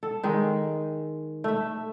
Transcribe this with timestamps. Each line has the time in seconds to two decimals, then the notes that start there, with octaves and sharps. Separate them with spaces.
0.03 A4
0.23 D#3 G#3
1.44 A3 E5